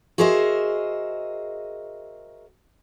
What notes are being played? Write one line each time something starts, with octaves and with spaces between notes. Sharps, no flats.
F#4 G#4 A#4 C5 D#5 E5